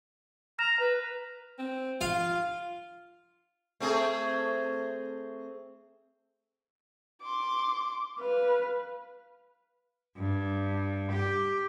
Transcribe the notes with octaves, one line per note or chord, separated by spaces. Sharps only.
A#5 F6 A#6 E7
B4
C4
F4 F5
A3 C4 G#4
C6 D6
B4 F5
G2
G4